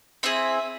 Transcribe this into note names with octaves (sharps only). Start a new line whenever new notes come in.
C4 E4 G#4 E5